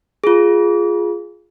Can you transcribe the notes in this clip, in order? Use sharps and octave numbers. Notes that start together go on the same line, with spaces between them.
F4 G#4